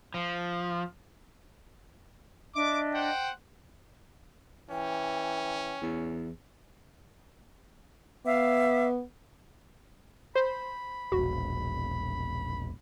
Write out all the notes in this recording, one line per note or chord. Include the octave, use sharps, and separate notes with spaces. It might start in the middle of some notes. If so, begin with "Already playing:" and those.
F3
D4 D#5 E5 D6
C5 F#5 G5
E3 C#4 G5
E2
B3 E5 F5 D6
C5 B5
E1 A#1 F#4